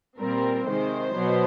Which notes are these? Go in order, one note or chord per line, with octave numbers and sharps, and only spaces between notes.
A#2 G3 C4 A#4
C3 D#3 G#3 C5
B2 F#3 B3